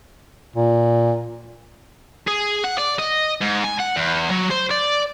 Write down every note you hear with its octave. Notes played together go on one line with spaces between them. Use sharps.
A#2
G#4
F#5
D5
D#5
G#2
G#5
F#5
E2
F#3
C5
D5